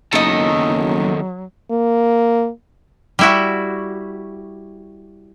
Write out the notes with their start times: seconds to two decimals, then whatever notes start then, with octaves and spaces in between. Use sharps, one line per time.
0.13 F#1 E2 D#3 F#3 A4 D#5
1.70 A#3
3.19 G3 E4 F#4